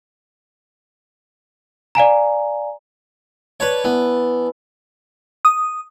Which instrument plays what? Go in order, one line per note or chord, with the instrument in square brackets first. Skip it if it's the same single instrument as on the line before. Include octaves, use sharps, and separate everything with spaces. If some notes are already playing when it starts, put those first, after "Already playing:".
[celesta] D5 F5 G#5 A#5
[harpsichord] B4 C#5 [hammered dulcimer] D5 A5
[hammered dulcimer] E3 [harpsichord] B3
[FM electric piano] D#6